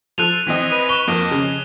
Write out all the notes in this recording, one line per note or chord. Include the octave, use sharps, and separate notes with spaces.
F3 A4 F#6 D#7 F7
E3 C4 D#5
B4 D#7
C#6 E7 G7
F2 A#3 D#5
C#3